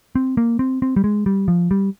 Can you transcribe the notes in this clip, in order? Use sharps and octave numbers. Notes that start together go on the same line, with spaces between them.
C4
A#3
C4
C4
G3
G#3
G3
F3
G3